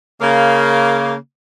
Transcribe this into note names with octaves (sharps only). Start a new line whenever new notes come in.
C#3 A#3